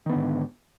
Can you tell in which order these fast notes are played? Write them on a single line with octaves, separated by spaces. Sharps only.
D#3 B3 D3 G#2